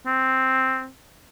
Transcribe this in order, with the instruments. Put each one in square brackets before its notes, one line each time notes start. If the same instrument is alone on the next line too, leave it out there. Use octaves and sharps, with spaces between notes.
[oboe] C4